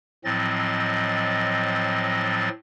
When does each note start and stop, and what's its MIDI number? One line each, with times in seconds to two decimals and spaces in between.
0.25 2.49 45
0.25 2.49 53
0.25 2.49 54
0.25 2.49 60
0.25 2.49 75
0.25 2.49 93